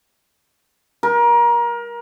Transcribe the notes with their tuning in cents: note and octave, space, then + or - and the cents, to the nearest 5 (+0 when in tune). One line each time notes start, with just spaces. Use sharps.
A#4 +25